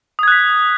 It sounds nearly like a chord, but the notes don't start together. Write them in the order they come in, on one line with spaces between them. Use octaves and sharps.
D#6 G#6 F#6 B6